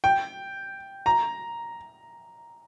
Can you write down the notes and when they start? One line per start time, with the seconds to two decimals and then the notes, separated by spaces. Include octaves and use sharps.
0.04 G5
1.06 A#5